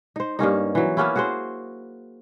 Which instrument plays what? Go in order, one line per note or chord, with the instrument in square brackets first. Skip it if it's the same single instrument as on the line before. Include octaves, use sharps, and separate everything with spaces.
[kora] D#4 C5
G2 A#3 C#4 D#4
E3 F#3
A#3 B3 C#4 E4
F#4 G#4 C5